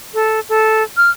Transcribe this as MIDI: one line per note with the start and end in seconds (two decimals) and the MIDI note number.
0.14 0.40 69
0.49 0.83 69
0.97 1.10 89